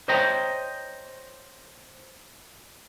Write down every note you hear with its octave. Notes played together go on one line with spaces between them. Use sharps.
C5 C#5 D#5 G5 A#5